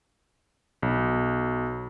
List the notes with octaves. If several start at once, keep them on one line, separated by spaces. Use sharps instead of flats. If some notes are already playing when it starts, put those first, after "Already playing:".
B1